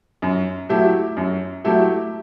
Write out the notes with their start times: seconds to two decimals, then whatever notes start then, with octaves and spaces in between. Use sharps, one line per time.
0.22 F#2
0.69 F#3 A3 E4 G4
1.17 F#2
1.64 F#3 A3 E4 G4